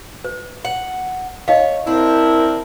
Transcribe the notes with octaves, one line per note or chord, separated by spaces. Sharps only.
B4
F#5
D#4 C#5 D#5 F5
C4 D4 E4 A#4